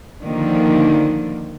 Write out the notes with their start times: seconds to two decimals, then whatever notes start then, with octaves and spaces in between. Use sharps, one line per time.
0.22 D3 D#3 F3 A#3 D4